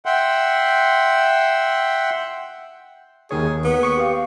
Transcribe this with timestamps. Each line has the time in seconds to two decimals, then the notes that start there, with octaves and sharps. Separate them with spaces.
0.06 E5 F#5 G5 C6
3.31 D#2 D#3 G#4 C#5
3.64 B3
3.83 C#6 C#7
3.97 G4 F5